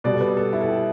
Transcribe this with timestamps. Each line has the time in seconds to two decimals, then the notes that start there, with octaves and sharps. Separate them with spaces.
0.04 B2 G3 D5
0.14 A4
0.21 B4
0.37 A4
0.53 E4
0.61 A4
0.69 G4